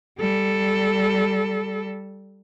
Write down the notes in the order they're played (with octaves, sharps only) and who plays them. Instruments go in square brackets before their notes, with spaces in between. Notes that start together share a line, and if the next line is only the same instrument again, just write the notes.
[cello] G3 A4